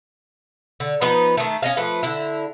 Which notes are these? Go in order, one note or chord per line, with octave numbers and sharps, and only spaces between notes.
D3
F3 B3 D#4 B4
D#3 A3
C#4 D#5 F5
F3 A3 B4
D3 E4